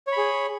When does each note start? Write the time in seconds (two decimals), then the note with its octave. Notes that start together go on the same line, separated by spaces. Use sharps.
0.07 C#5
0.12 B5
0.17 G#4